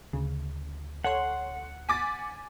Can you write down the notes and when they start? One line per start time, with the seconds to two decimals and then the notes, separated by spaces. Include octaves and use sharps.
0.13 D2 C#3
1.04 A4 C#5 F#5 C6
1.89 G#5 D6 A6 B6